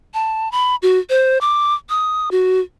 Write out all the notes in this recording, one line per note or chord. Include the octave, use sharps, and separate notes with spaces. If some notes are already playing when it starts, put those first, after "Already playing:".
A5
B5
F#4
C5
D6
D#6
F#4